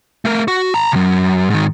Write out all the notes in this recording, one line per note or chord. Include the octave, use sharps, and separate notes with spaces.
A3 A#4
F#4
A5 A#5
C2 F#2
G#2 D#3